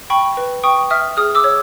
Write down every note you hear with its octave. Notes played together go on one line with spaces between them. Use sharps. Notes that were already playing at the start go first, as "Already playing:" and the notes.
G5 B5 C#6
B4
G5 C#6 D#6
E5 D#6 F6
G#4 D#6 F6
D6 E6
C#5